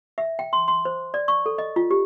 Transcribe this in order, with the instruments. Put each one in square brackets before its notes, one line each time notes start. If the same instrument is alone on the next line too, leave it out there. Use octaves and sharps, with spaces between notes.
[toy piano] E5
G5
C6
C6
C5
D5
C#6
A4
D#5
F4
G4